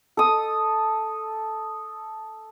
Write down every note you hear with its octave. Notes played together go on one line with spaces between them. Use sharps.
A4 D#6